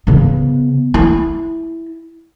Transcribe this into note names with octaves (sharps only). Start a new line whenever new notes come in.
C#3 B3
E4